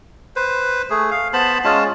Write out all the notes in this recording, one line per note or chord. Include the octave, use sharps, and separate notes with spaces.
B4 C5
A3 G#4
F5
B3 C5 A5 B5
G#3 C#4 F4 A5